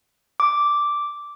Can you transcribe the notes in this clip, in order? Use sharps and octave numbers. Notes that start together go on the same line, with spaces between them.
D6